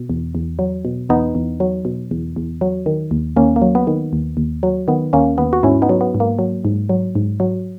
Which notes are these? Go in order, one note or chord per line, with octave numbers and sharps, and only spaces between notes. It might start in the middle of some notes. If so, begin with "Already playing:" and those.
Already playing: B2
E2
E2
F#3
B2
E2 B3 D#4
E2
F#3
B2
E2
E2
F#3
D#3
D#2
D#2 A#3 C#4
A#3
F#3
B3
D#3
D#2
D#2
F#3
D#3 B3
D#2 A#3 C#4
D#2 B3
F#4
G#2 C#4 E4
B3 D#4
F#3
B3
G#2
A#3
F#3
G#2
F#3
G#2
F#3